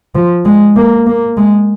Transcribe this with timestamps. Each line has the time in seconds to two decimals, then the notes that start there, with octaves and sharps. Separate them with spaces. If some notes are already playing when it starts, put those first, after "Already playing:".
0.15 F3
0.45 G#3
0.76 A#3
1.07 A#3
1.37 G#3